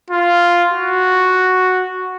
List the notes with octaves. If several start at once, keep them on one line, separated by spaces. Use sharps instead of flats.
F4
F#4